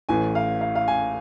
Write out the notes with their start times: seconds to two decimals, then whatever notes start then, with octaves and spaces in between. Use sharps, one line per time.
0.09 A1 A2 E3 G#5
0.35 F5
0.61 F5
0.75 F5
0.88 G#5